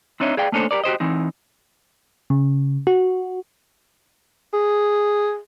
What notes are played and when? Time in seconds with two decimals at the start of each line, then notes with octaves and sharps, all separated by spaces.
0.20 C4 D4 D#4 C#5 E5
0.37 G#4 D5 F5 G5
0.52 A3 A#3 C#4 D4 A4 C5
0.71 G4 A4 A#4 D5
0.84 F#4 G4 C5 D#5
1.00 E3 C4 D#4
2.30 C#3
2.87 F#4
4.53 G#4